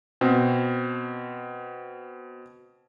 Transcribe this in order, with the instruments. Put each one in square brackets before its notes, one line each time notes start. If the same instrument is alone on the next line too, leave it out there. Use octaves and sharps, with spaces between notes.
[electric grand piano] B2 C4